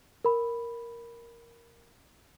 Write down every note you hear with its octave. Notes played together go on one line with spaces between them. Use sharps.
A#4 B5